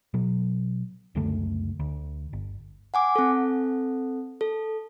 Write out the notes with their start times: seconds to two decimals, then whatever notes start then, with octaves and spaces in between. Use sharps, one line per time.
0.14 B2 F#3
1.15 C#2 F#2 D3 A3
1.79 D2
2.33 G1
2.94 F#5 G#5 D6
3.16 C4 A4
4.41 A4